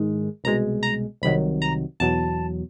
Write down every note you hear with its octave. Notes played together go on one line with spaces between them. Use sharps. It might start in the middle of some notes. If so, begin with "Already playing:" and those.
Already playing: G#2 D#3 G#3
C2 B2 G#3 A#5
A#5
C2 C3 D#3 F#3 B5
A#5
E2 B2 F#3 A5